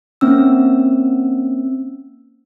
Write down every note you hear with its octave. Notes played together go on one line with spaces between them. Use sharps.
A#3 C4 C#4 E6